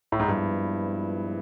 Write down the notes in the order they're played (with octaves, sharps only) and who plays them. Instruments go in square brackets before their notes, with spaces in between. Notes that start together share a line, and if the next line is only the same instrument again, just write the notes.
[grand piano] A2
G#2
[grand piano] G2 [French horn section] A#2 F3 G#3 B3 E4